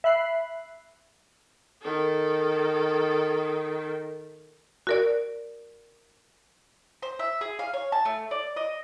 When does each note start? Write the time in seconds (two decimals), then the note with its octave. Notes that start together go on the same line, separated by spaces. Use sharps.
0.04 E5 B5 F#6 C7
1.82 D#3 A4
4.87 F#4 A#4 D5
7.02 C5
7.19 E5
7.41 G#4
7.59 F5
7.73 C#5
7.92 A5
8.05 A3
8.31 D5
8.56 D#5